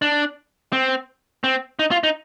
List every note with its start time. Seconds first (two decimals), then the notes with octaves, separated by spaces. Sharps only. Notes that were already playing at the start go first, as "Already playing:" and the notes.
0.02 D4
0.73 C4
1.44 C4
1.79 D#4
1.91 F4
2.03 D#4